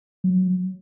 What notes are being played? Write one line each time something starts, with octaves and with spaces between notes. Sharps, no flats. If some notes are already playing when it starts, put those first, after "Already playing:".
F#3